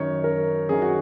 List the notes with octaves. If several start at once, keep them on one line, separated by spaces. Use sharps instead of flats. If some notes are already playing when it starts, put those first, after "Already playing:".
Already playing: F#2 D#3 C#5
A#4
F#2 D#3 G#4
F#4